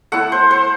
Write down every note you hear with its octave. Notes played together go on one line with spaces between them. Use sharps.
A3 E4 F#5
C5
C5